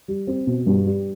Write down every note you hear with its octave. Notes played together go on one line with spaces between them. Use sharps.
G3
C4
B2
G2
G3